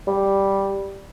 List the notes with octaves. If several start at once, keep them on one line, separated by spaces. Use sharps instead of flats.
G3